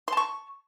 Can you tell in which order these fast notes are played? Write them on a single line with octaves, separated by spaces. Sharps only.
C6 A5 C#6